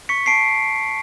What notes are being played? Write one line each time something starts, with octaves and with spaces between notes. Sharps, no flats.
C#6 B6 C#7
A5 C7 D7